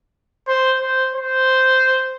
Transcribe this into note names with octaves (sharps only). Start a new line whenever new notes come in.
C5
C5
C5